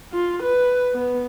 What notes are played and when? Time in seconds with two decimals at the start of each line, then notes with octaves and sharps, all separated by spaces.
0.13 F4
0.43 B4
0.94 B3